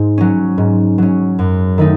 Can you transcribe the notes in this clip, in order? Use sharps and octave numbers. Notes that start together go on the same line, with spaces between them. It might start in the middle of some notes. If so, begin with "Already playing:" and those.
Already playing: G#2
F#3 C#4
G#2
F#3 C#4
F#2
D#3 A3 D#4